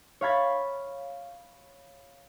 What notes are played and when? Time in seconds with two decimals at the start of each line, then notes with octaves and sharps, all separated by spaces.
0.21 C#5 F5 B5 G#6 A6